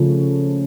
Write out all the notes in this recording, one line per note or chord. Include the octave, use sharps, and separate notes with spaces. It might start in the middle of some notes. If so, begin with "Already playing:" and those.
Already playing: C#3 F3 A3 C#4